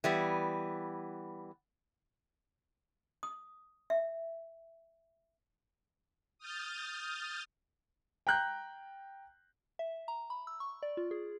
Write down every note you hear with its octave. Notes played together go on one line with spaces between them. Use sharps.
E3 G3 B3
D#6
E5
D#6 F6 G6 A6
G5 A#5 F#6 G6
E5
A#5
B5
E6
C#6
D5
F4
G#4